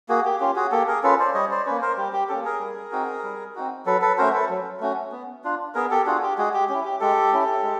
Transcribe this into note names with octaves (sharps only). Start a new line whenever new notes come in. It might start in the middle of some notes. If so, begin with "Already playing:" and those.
A#3 F#4 G#4
G4
C#4 F4 G4
F#4 G#4
A#3 G4 A4
G#4 A#4
C#4 F4 A4 B4
C5 D5
G3 C#5 D#5
C5 D5
A#3 C#4 B4 C#5
A#4 C5
G3 G4
G4
A#3 C#4 G4 A4
G#4 A#4
G3
C4 D#4 F#4
G3
C4 D#4 F#4
F#3 A4 B4
A4 B4
A3 C#4 F#4 A#4 C5
A4 B4
F#3
A3 C#4 F#4
B3
D4 F4
B3 G#4 A#4
G4 A4
D4 F4 F#4 G#4
G4
G#3 F#4 G#4
G4
C#4 E4 G4
G4
G#3 G4 A4
C#4 E4
G#3